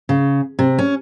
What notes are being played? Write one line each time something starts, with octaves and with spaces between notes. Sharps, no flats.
C#3
C3
C#4